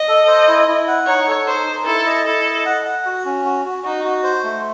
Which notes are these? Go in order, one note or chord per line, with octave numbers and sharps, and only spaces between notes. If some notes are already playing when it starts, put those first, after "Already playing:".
Already playing: D#5
A4
C5
E4
E4
F#5
D#4 C#5
A4
D#4 C5
D#4
E4 A4
D#5
E4 A4
D#5
F#5
F#5
F#4
C#4
F#4
F#4
D#4 F#4
F#4
C5
A3